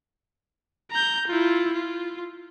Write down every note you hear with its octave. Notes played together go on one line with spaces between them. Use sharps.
A#5 G6
E4 F4
F4